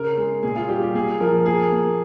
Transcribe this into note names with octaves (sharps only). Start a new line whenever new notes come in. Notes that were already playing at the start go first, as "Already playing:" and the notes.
Already playing: C#3 A#4
G#3
A#2 G#4
F4
G3 G4
G4
A#2 G#4
F3 A#4
A#3 G#4
A#3